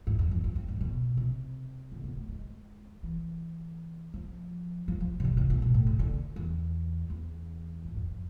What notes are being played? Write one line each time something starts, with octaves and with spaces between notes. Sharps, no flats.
G#2
F2
E2
F2
F2
G#2
B2
C3
D3
B3
A3
G#3
E3
F3
F3
F3
C3
D3
C3
B2
G#2
A2
C3
D3
E2
E2
G#2
F2